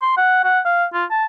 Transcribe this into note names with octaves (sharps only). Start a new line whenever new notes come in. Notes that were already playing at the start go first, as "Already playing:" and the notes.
C6
F#5
F#5
F5
F4
A5